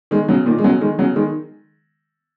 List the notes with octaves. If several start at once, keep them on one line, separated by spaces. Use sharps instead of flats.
D#3 G#3
C#3 F#3
A#2 D#3
G#3
C#3 F#3
D#3 G#3
C#3 F#3
D#3 G#3